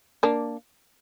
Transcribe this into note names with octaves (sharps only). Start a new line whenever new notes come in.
A#3 D4